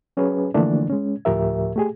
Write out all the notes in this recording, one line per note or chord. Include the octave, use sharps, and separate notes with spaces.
F#3 C#4 G#4 B4
D3 E3 F3 A3 A#3 D4
G#3 C#4
D2 A2 F3 G4 A#4 E5
A3 G4 G#4